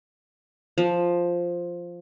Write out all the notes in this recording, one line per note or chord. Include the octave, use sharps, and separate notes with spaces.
F3